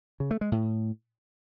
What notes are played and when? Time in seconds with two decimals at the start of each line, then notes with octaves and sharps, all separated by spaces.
0.20 C#3
0.31 A3
0.41 G#3
0.52 A2